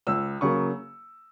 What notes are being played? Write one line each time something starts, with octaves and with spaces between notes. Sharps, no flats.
C#2 E6
C#3 F#3 A#3 C#6